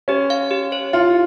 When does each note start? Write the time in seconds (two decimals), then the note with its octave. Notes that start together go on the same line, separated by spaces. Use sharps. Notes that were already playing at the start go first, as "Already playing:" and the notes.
0.08 C#4 G4
0.30 F5
0.51 G4
0.72 C#5
0.93 E4 F4